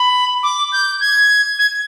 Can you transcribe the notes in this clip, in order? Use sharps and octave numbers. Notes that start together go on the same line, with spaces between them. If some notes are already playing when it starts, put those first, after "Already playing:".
Already playing: B5
D6
G6
G#6
G#6